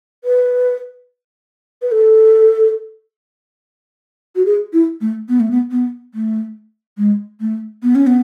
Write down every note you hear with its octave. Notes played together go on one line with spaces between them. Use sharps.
B4
B4
A4
F#4
G#4
E4
A3
B3
A3
B3
B3
A3
G#3
A3
B3
C#4
B3